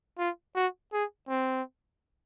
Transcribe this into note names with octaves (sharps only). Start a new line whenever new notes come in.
F4
F#4
G#4
C4